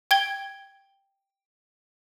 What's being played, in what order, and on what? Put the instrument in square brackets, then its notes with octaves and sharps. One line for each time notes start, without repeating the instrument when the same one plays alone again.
[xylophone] G5 G#6 G7